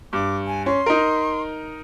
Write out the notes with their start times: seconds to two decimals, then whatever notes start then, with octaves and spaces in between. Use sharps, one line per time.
0.13 G2 D6
0.47 G#5
0.66 C#4 C6
0.86 D#4 A#4